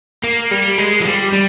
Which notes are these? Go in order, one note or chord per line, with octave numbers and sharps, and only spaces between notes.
A#3
G3
G#3
F3
G3
G3